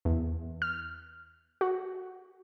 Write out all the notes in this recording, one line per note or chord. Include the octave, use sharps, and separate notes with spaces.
E2
F6
F#4